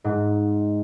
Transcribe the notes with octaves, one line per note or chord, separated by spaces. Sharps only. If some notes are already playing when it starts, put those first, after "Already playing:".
G#2